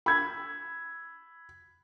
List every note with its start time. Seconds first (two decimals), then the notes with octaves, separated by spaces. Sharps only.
0.06 B5 E6 G#6